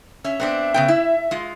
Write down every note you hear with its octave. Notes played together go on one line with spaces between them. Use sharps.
C#4 E5
B3 C4 D4
C#3 B3 G5
E4
G#3 F4